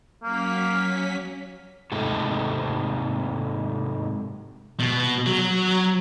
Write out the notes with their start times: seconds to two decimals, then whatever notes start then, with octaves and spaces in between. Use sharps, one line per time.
0.23 F#3 A#3 C#4 B6
1.92 G#2 C3 A3 A4
4.80 B2
5.26 F#3